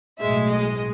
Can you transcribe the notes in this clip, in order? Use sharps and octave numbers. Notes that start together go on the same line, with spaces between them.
B1 A2 G#3 E5
D#5